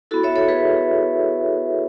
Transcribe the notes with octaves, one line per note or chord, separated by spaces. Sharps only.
B3 E4 F#4 A4
C#5 E5
A4 C#5
G#4 B4